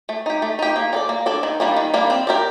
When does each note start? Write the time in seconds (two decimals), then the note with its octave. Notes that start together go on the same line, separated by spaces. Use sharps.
0.09 A3
0.26 D#4 G4
0.42 A3
0.59 D#4 G4
0.76 A#3
0.93 D4 A4 D5
1.09 A#3
1.26 D4 A4 D5
1.43 D#3
1.60 G3 A#3 D4
1.77 D#3
1.94 G3 A#3 D4
2.10 C4
2.27 G4 A#4 D5